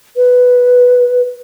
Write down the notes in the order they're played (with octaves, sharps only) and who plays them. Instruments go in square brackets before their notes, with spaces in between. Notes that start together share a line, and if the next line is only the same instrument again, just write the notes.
[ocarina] B4